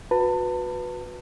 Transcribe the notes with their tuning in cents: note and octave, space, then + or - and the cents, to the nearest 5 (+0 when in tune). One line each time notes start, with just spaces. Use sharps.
F#4 -25 B4 +0 A5 +30